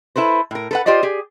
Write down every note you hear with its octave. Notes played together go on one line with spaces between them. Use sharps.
E4 A4 B4 C5
A2 A#4
A4 B4 F#5
F4 G4 C5 D5 D#5
G4 G#4